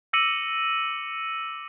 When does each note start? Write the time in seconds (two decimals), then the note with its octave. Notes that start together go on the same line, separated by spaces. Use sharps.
0.13 D6 E6 A#6 C#7 D#7 F#7